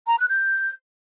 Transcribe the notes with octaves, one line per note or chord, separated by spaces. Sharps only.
A#5
F#6
G6